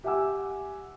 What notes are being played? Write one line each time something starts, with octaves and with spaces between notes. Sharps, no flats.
G4 E5 F#5 G#5 D6 E6